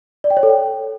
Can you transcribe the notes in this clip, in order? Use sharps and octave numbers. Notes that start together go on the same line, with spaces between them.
D5
G5
C#5
A4
G5